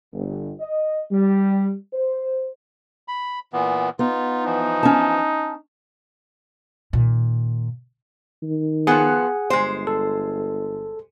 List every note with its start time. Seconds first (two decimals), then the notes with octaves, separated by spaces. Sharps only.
0.13 G1
0.60 D#5
1.11 G3
1.93 C5
3.08 B5
3.53 A#2 E3 B3
3.99 B3 D#4 F4
4.45 E3 F3 D#4
4.83 C#4 A5
6.93 A#2 D#3
8.43 D#3
8.87 F3 B3 G#4 F#5 G#5
9.50 G1 G#3 C5
9.87 A4